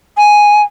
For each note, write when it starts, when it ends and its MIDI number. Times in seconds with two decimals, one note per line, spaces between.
0.17 0.62 80